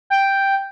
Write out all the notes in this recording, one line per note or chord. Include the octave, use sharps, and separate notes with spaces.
G5